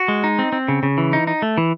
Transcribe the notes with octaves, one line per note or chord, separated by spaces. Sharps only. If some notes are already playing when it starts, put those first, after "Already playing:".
Already playing: F#4
G#3
D#4
C4
C4
C#3
C#3
E3
D#4
D#4
A3
E3